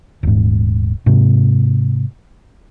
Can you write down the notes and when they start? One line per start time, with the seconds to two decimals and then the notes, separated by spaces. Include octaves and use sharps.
0.23 D#1 G#2
1.06 G#2 C3